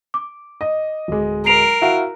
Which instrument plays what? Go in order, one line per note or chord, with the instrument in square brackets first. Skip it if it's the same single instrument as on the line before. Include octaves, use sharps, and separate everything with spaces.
[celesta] D6
[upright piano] D#5
[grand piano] D1 G#3
[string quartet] A#4 [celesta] C7 D7 F7
[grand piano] E4 F#4 F5